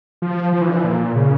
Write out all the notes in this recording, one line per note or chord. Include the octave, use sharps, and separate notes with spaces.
F3
F3
E3
D3
E3
A#2
C#3